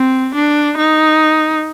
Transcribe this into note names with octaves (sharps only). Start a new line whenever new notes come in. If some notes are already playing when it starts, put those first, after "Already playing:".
Already playing: C4
D4
D#4